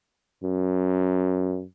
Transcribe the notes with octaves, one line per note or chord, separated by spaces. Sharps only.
F#2